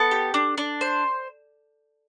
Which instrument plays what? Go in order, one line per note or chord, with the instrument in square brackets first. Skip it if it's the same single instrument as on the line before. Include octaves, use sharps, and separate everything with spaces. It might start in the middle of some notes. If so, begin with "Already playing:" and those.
Already playing: [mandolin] B3 [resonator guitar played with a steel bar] A4
[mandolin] G4
D4
D4
C5